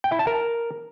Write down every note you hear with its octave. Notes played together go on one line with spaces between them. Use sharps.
G5
E4
A5
A#4